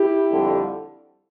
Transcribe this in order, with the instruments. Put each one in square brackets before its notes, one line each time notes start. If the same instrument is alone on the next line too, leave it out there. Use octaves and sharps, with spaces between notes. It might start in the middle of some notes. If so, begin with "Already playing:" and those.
Already playing: [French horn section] E4 G4
F2 D3 G3